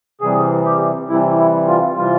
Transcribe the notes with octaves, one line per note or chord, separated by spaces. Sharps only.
C3 E3 G3 G#4
G4
C3 E3 G3 E4
E4
F4
C3 E3 G3 F4